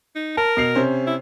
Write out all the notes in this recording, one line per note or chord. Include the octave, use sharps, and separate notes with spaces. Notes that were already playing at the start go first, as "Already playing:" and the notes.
D#4
A#4 A5
B2 C7 F7
C3 C#4 C5
E4